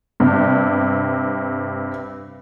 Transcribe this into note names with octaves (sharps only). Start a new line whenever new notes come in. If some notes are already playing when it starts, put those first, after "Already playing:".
G2 C3